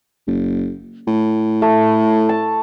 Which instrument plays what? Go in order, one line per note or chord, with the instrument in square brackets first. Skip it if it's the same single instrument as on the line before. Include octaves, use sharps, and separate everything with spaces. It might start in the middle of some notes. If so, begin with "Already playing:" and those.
[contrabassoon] F#1
A2
[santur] A3
A5